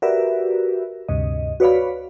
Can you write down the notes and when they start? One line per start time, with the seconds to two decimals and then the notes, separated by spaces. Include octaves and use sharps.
0.02 F#4 G4 A#4 B4 D5 E5
1.08 D2 G2 C3 D#5
1.60 F#4 B4 C#5 D5 F5 B5